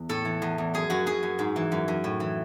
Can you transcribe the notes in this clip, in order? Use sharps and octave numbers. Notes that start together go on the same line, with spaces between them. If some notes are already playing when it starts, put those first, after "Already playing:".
Already playing: E2
A2 A4
E3
E2
E2
F#2 G#4
F#2 F#4
F#2 G#4
F#2
G#2
E3
F#2
F#2
A2
E3